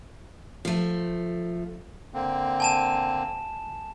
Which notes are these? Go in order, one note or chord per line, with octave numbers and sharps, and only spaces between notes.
F3 A3
D3 A#3 C4
G#5 A5 E7